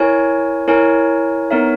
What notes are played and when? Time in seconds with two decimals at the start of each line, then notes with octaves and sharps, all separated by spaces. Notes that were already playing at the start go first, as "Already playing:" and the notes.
Already playing: E4 A#4 C#5 G#5
0.68 E4 A#4 C#5 G#5
1.51 B3 D#4 A#4 C#5 E5